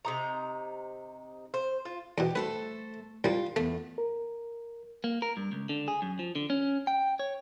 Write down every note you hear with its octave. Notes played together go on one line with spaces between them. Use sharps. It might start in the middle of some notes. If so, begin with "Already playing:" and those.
C3 D#4 A#5
C5
F4
E2 B2 G4
A3 A4 B4 C5
C2 G3 F4
E2 A3
A#4
A#3
A#4
G2
C#2
D3
G#4
F#2
F3
D3
C#4
G5
C#5